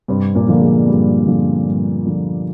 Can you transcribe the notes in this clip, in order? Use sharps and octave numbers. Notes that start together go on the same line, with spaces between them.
G2 C3 C4
A#2 A#3
D3 F3 A#3
G#3
G2 G3
D3 F3
G2
D3 F3